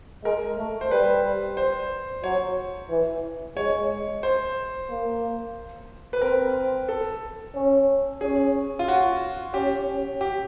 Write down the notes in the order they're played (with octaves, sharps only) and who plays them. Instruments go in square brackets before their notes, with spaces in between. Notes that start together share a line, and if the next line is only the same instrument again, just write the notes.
[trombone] G#3 [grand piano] A#4
[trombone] A3
[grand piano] C5
[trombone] G3 [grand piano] B4
[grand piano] C5
[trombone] F#3 [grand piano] C#5
[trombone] E3
[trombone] G#3 [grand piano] C#5
[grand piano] C5
[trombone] A#3
[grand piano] B4
[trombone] C4 [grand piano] A#4
[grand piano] A4
[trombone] C#4
[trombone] C#4 [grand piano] G#4
[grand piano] F4
F#4
[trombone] C#4 [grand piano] G4
[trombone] C#4
[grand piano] G4